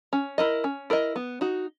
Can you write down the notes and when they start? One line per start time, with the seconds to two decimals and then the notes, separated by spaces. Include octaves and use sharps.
0.13 C#4
0.38 E4 A#4 D#5
0.64 C#4
0.90 E4 A#4 D#5
1.16 B3
1.41 D#4 F#4